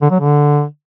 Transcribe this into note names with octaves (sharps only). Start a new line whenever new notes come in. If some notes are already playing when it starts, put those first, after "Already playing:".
D3
F#3
D3